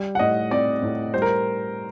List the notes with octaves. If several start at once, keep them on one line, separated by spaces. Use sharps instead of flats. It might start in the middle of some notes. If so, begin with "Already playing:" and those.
Already playing: G3
F#5
A2 D#5
C4 D5
A2
G3 C5
A#4